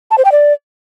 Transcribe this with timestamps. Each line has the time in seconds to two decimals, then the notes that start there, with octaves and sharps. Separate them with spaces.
0.11 A5
0.18 C5
0.25 G5
0.32 D5